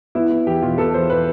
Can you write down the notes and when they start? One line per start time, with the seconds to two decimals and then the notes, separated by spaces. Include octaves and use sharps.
0.15 B3 E4
0.31 B3
0.47 E2 G4
0.62 B2 F4
0.78 B3 A4
0.94 E2 C5
1.10 B4